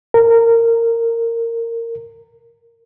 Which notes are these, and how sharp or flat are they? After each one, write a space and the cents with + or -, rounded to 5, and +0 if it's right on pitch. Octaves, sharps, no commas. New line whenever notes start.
A#4 -20